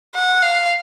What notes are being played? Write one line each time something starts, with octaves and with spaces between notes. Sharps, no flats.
F#5
F5